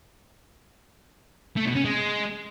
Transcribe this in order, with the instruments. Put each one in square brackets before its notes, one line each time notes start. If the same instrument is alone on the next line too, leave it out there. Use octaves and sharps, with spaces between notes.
[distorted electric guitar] A3
B2
C#4
G#3